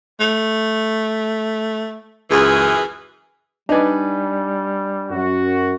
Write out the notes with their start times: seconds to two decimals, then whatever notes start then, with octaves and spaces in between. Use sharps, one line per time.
0.20 A3
2.31 C#2 F#2 E3 G#4
3.69 G3 D4 D#4 B4 D5 G#5
5.09 F#2 F#4